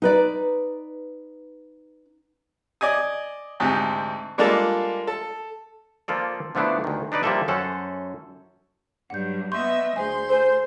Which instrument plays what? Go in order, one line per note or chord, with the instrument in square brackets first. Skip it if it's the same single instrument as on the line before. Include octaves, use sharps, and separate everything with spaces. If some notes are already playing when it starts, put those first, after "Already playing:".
[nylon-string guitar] D#4 B4 D5
[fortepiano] D5 D#5 G#5 D#6
D2 G#2 C3
G3 G#3 A#3 D4 F4 A4
A4
[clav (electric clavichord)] F3 A#3 F4 A4 D5
D3 F3 A3 B3 D4 E4
D2 D#3
D4 D#4 B4 D5
F3 G3 A#3 F4 A4 E5
F#2 C#4 A4 C5 F#5
[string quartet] G2 F#3 [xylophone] F#5 G6
[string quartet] B3 D#5 E5 [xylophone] C6 C#6 G6
[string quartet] D2 C6 G6 [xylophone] G#4 C5 G#5
[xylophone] A4 G#5 [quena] C5